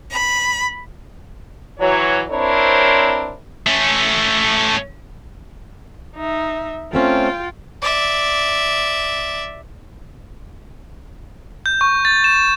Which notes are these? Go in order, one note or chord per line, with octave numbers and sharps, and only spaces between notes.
B5
E3 F#3 C#5
C4 D4 E4 A#4 C5 C#5
A3 C#4
D#4 E5
A3 C4 C#4 F4 G5
D5 E5
G6
C#6
A6
E7